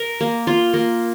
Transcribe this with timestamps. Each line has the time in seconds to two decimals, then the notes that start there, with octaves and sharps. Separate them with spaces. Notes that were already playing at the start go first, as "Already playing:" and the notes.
Already playing: A#4
0.20 A#3
0.47 F4
0.74 A#3